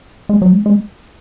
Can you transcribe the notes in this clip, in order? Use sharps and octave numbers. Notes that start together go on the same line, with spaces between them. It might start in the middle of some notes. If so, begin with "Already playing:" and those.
G#3
F#3
G#3
G#3